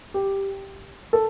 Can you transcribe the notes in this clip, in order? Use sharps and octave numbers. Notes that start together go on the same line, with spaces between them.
G4
A4